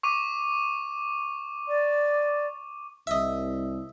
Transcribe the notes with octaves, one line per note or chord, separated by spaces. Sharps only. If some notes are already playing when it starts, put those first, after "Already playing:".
C#6 D6 D#7
D5
C2 D#5 E5